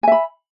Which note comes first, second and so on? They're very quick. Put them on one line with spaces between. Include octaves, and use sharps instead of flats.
G#5 E5 B5